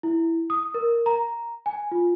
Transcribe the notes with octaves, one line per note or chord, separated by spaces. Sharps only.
E4
D#6
A#4
A#5
G#5
F4